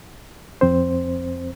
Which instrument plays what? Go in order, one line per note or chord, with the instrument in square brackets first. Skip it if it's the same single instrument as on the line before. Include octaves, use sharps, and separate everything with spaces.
[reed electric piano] F2 C4 C5